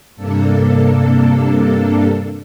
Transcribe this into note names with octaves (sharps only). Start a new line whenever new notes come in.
G2 C3 A#3 D4 A4